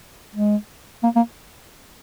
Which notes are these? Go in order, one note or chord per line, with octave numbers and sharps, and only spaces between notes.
G#3
A#3
A#3